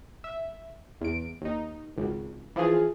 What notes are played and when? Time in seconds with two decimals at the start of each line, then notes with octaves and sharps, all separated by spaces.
0.24 E5
1.01 E2 D7
1.41 D#2 D#4
1.96 G#1 C#2
2.56 E3 F3 F4 G#4